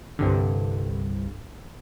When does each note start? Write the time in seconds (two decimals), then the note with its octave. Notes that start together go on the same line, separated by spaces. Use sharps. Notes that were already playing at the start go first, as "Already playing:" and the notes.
0.19 C2 G2 D3